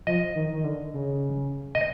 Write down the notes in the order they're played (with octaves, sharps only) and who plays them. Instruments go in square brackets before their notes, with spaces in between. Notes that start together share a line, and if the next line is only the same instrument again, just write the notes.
[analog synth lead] F3 [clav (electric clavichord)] D#5
[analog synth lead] D#3
D#3
D3
C#3
[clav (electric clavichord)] D#5